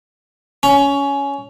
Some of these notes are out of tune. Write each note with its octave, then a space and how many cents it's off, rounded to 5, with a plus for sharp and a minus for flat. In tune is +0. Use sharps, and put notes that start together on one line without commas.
C#4 +15